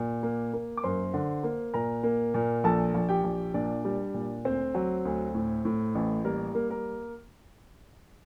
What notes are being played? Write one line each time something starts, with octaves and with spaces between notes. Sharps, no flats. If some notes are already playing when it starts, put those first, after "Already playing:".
Already playing: A#2
A#3
A#3
D6
F#2 C5 C6
D3
A#3
A#2 A#4 A#5
A#3
A#2
A#1 A4 A5
A#1
G4 G5
A#1
A#2 D4 D5
G3
A#2
D2 C4 C5
F#3
D2
A2
A2
A1
G3 A#3 A#4
A#3
A#3 A#4